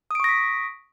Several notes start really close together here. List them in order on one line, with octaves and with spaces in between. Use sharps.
D#6 D7 C#6 A#6 B6